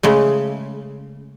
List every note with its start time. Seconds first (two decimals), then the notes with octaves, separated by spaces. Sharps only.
0.03 C#3 G#3 A3